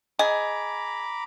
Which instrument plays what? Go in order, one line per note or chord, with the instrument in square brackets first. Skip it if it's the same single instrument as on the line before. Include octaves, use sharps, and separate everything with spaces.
[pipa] G#4 [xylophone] D#5 [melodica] A#5 B5 D6